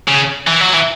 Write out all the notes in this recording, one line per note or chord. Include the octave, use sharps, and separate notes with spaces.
C#3
E3
F#3
E3